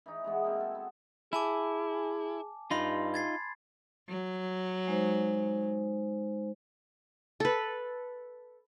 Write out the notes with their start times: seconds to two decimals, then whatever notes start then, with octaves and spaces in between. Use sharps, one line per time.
0.06 E3 D#4
0.24 E3 G#3 B3 F#4
0.44 A#3 C4 E5
0.60 A4 G#5
0.75 B3
1.33 E4 G#4 G#5 A5 D6
2.71 G2 D#4 F4 B5 C6
3.14 G#6 A6 C7
4.09 F#3
4.88 G#3 D#4 C5
7.40 A4 B4